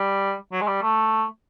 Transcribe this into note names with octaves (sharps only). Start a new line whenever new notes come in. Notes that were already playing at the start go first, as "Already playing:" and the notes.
Already playing: G3
F#3
G#3
G3
A3